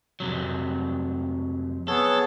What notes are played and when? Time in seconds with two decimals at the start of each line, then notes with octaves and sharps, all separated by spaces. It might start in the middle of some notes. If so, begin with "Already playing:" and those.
0.20 F2 C3 F#3
1.88 B3 G#4 A4 C#5